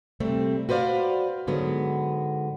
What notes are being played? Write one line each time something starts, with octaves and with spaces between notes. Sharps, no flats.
C3 G3 A3 C4
F#4 B4 C5 D5 F5
G#2 D3 F#3 B3